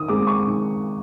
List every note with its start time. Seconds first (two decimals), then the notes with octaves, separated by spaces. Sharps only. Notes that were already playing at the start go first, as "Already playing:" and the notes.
Already playing: D#3 D#6
0.08 G#3 C4 D6
0.27 C#6
0.47 D#3